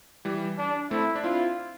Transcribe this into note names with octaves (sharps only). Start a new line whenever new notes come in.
E3 G3
D4
A3 C4 E4
D4
C4 E4 F4